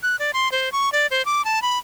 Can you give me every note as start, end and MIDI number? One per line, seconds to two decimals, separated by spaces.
0.03 0.16 90
0.19 0.31 74
0.33 0.51 84
0.52 0.72 72
0.72 0.92 85
0.92 1.07 74
1.11 1.25 72
1.25 1.44 86
1.45 1.62 81
1.62 1.79 83